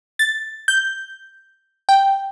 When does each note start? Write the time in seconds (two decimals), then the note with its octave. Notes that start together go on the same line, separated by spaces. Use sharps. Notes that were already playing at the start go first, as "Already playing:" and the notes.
0.19 A6
0.68 G6
1.89 G5